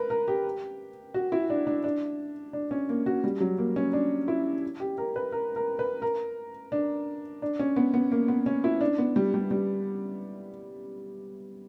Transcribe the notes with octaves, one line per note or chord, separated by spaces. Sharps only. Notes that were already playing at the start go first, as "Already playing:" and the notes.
Already playing: A#4 B4
A#4
G4
F#4
E4
D4
D4
D4
D4
C#4
A#3
F#4
G3
F#3
A#3
C#4
D4
E4
G4
A#4
B4
A#4
A#4
B4
A#4
D4
D4
C#4
B3
B3
A#3
B3
C#4
E4
D4
B3
G3
G3
G3